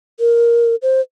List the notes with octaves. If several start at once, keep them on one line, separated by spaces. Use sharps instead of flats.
A#4
C5